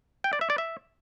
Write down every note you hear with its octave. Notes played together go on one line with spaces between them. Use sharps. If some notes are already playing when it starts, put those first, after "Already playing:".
G5
D5
E5
D5
E5